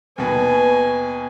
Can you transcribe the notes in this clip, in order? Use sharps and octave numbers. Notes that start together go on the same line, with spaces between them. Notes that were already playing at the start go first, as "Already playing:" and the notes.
D#2 B2 B4 G#5